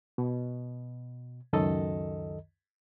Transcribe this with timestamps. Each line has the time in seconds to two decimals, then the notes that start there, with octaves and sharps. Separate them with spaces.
0.18 B2
1.53 C#2 F#2 D#3 A4 D#5